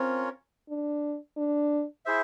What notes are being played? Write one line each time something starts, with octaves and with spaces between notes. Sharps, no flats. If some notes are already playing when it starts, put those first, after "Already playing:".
Already playing: C4 C#4 F4 A#4 C#5
D4
D4
E4 G#4 C5 E5